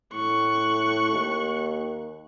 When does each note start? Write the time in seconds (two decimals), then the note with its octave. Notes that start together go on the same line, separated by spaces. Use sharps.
0.13 A2 C#6 F#6
1.13 D#2